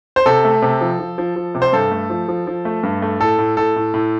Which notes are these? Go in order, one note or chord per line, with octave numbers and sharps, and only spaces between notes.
C5
C3 A4
A3
C3
F3
F3
F3
F3
C3
C5
G2 A4
A3
F3
F3
F3
A3
G2
A3
A2 A4
A2
A2 A4
A2
A2